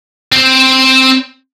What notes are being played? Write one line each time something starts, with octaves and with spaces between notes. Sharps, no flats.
C4